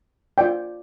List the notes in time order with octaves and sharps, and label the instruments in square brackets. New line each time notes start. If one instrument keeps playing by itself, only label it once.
[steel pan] F4 D5 G5